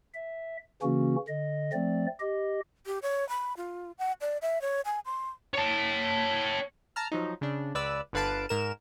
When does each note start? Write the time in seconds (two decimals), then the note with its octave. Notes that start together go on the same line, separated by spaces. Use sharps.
0.14 E5
0.82 C#3 E3 A#3 C#4 F#4
1.28 D3 D#5
1.73 F3 A3 C4 D5
2.20 G4 D#5
2.86 G4
3.02 C#5
3.29 B5
3.57 F4
3.99 F#5
4.21 D5
4.42 E5
4.61 C#5
4.85 G#5
5.05 C6
5.54 C#5 A5
6.96 A5 A#5 F6
7.12 F3 F#3 D#4
7.41 C#3 D4
7.75 C#2 B4 D5 E6
8.13 G1 D3 B4 F5 A5 D7
8.49 G#2 A#4 E7